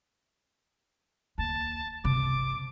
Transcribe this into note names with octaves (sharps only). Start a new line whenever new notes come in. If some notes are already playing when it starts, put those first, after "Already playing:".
D#2 A5
G1 C3 D6